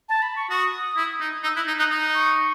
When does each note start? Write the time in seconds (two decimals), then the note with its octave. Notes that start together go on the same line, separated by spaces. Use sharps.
0.09 A5
0.22 B5
0.36 C#6
0.50 F#4 D#6
0.97 E4
1.21 D#4
1.43 D#4 E6
1.56 E4 F#6
1.68 D#4
1.79 D#4 F#6
1.91 D#4
2.14 C#6